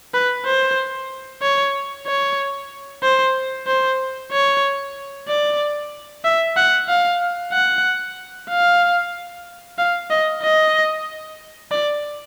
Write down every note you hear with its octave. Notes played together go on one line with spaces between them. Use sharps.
B4
C5
C#5
C#5
C5
C5
C#5
D5
E5
F#5
F5
F#5
F5
F5
D#5
D#5
D5